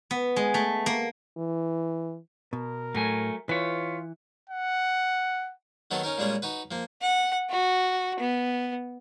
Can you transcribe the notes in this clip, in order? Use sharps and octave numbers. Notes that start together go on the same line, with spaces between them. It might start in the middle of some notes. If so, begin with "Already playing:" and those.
B3
G#3
A3
A#3
E3
B2 A#4
A2 F#3 A3 G#5
E3 F4 B4 C#5
F#5
D#3 F#3 B3 D#4 A4
C#4 D#4 A#4
A#2 G3 G#3 C#4 G#4
D#4 F#4 B4
F3 A#3
F#5
F#4
B3